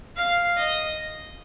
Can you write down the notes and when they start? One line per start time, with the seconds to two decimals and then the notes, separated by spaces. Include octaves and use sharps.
0.17 F5
0.57 D#5